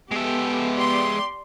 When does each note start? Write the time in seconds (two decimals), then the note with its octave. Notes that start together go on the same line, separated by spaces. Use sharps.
0.11 G#3 B3 G4 A4 E5
0.75 G4 D5 C6